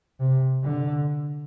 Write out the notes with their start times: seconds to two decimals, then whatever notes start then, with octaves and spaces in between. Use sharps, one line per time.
0.20 C3
0.64 D3